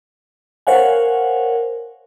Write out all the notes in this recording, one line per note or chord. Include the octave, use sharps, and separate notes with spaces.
A#4 C5 C#5 F5 F#5 G#5